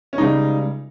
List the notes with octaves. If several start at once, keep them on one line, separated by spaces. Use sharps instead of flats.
C#4
C#2 C#3 G3 D#4